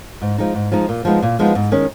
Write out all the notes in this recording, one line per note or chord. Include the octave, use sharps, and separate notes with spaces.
G#2
F3 G#3 D#4
G#2
F3 G#3 D#4
A#2
F3 G#3 B3 D#4
A#2
F3 G#3 B3 D#4
G#2
D#3 G#3 C#4